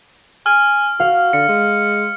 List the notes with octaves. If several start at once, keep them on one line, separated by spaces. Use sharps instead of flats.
G#5 F6
F#4 F5
D3 C#7
G#3